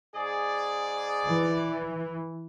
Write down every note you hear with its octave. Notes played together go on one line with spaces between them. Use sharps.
G#2 G#4 D5
E3